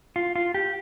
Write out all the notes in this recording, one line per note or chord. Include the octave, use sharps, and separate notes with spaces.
F4
F4
G4